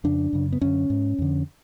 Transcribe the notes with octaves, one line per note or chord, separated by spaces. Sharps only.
F2 C#3 D4
F#2 C#3
B3
F#2 D3 C#4
G#2
F2 D3